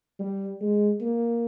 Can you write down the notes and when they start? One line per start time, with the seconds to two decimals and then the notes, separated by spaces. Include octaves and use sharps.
0.19 G3
0.61 G#3
1.01 A#3